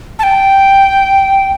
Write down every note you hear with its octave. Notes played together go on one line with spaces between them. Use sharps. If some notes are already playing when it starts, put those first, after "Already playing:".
A5
G5